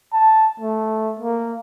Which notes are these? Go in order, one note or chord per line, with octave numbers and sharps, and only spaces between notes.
A5
A3
A#3